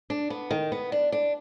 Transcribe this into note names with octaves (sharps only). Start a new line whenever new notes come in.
D4
B3
D#3
B3
D4
D4